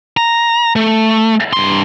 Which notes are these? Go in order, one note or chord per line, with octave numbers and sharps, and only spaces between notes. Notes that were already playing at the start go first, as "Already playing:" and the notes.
A#5
A3
G2 C6